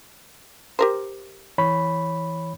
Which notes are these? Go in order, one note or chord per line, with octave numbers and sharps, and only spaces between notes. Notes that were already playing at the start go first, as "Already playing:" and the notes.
G4 A#4 C5
E3 C#5 B5